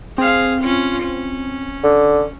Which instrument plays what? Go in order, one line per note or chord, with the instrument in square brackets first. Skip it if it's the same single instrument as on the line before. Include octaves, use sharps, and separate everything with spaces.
[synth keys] C4 [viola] G#4 F5
[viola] C#4 F4
C#4
[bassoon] D3